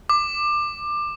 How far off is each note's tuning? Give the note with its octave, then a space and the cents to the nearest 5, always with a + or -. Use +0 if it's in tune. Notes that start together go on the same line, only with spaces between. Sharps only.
D6 +20